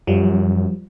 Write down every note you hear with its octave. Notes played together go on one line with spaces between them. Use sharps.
F#2 F3 G3